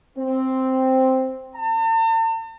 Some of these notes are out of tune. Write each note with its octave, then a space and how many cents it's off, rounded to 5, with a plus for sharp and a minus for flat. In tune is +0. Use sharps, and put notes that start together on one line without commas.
C4 +0
A5 +45